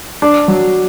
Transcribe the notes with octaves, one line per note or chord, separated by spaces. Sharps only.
D4
F#3